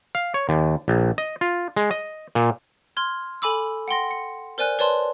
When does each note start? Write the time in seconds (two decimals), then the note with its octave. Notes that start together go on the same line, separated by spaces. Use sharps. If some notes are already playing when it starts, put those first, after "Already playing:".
0.15 F5
0.34 C#5
0.49 D#2
0.88 A#1
1.18 D#5
1.41 F4
1.76 G#3
1.91 D#5
2.35 A#2
2.97 C6 F6 G#6
3.42 A4 G#5 B5 D6 E6
3.88 F#5 G5 C6 A#6
4.11 C#7
4.58 A#4 C5 D5 G#5 F#6
4.79 B4 C#5 D5 A5 C6